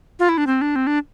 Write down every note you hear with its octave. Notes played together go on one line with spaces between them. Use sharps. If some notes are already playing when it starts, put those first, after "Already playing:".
F4
E4
D4
C4
D4
C4
D4